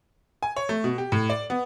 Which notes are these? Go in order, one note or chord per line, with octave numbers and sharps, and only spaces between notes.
G#5
C#5
A3
B2
G4
A2
D5
B3